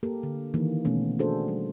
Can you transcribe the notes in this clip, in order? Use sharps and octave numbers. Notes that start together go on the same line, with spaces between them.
A#3 G4 A4 A#4
D3
D#3 E3 A#3
B2 E3 A3 B3 C#4
D4 F#4 G#4 A4 C5
G3